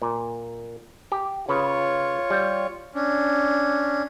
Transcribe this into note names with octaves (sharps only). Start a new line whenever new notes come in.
A#2
G4
C#3 F4 B4 C#5
G3
C#4 D4